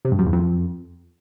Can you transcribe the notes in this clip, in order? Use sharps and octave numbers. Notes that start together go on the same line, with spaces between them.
C3
G2
F#2
E2
F2